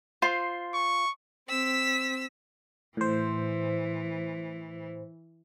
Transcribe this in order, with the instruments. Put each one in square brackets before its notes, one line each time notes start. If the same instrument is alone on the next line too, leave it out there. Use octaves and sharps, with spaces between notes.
[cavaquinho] F4 C5
[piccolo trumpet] C#6
[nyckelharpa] C4 [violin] E6 B6
[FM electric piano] A2 C5 [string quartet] E3